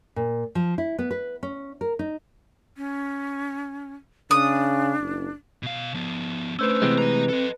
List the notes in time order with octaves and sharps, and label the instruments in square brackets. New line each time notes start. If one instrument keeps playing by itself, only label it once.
[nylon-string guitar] A#2
F3
E4
B3
B4
C#4
A#4
D#4
[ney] C#4
[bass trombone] C#3 [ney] D4 [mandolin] D#6
[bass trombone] F#1
[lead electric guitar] B2 F5
F3 B3
[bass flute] A3 [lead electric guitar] C#4 D4 [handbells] B4 C5 E6
[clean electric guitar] C3 E3 G#3 [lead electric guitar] B3 C4
[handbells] B4 [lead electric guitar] D#5 A#5
[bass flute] C4 [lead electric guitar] A4 D#5